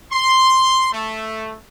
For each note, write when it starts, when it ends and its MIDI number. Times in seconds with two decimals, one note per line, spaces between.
0.12 0.90 84
0.93 1.55 57